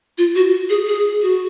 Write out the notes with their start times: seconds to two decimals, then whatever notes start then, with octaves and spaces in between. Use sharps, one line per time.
0.18 F4
0.35 F#4
0.70 G#4
0.87 G#4
1.22 F#4